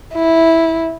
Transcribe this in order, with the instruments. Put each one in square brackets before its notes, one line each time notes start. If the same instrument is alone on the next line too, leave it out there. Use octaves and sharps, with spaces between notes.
[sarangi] E4